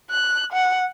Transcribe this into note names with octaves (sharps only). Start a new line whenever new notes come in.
F#6
F#5